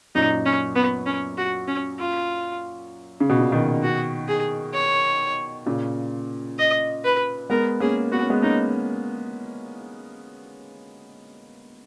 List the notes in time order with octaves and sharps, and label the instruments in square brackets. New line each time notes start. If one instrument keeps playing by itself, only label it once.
[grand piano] F#2 A#2 [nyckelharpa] D#4
[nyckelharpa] C#4
B3
C#4
F#4
C#4
F4
[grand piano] C#3
B2
A#2 C#3
B2 D#3
[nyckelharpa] F#4
G#4
C#5
[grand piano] A#2 C#3
[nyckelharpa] D#5
B4
[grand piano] G#3 B3 [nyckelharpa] A#4
[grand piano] A#3 C#4 [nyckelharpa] G#4
[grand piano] B3 [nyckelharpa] F#4
[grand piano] C#4
G#3 B3
[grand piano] A#3 C#4 [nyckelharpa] D#4